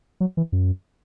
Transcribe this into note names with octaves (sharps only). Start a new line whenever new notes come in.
F#3
E3
F#2